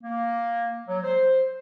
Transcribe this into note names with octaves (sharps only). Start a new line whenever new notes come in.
A#3
F#3
C5